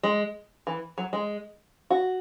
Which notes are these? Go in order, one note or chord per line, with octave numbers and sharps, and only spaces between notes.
G#3
E3
F#3
G#3
F#4